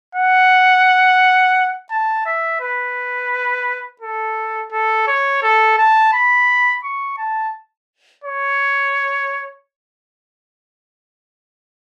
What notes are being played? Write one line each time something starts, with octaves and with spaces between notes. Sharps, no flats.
F#5
A5
E5
B4
A4
A4
C#5
A4
A5
B5
C#6
A5
C#5